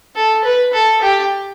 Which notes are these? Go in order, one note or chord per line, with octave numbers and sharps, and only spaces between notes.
A4
B4
A4
G4